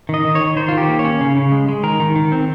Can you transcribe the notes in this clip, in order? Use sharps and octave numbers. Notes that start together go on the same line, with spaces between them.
D#3 D#5
D#3
C#5
D#3
D#3 C5
D#3 F4
G4
A#3
C#5
C#4
C#3
C#3
G#3
G#3
D#3 A#4
D#3
D#3
C4